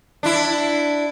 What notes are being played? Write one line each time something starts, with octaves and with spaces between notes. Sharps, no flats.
D4 E4